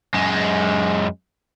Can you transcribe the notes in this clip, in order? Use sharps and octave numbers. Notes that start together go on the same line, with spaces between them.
F#2 G#3